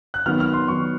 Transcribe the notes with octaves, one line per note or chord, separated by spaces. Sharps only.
F#6
D#3 F#3 B3 F6
F6
C6
D#3 F#3 B3 C#6